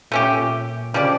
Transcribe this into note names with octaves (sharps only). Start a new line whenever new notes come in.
A#2 A3 C#4 G4
A#2
C#3 F3 C#4 G4 D5
D3